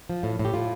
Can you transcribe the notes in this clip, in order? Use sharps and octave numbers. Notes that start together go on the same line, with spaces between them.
F3
A2
A2
G4
A2 F4